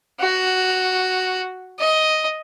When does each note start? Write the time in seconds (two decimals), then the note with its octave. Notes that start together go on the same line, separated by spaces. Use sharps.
0.20 F#4
1.79 D#5